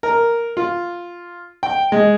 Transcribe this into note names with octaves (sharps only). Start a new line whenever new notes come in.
A#4
F4
G5
G#3